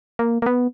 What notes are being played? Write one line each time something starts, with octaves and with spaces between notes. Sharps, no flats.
A#3
A#3
B3